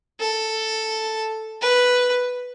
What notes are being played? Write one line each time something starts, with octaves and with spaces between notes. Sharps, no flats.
A4
B4